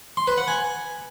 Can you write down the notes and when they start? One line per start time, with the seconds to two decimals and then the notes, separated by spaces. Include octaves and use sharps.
0.17 C6
0.27 B4
0.38 F#5
0.48 G#5